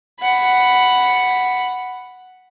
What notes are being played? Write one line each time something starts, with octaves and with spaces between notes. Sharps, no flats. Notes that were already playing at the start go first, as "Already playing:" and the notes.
F#5 B5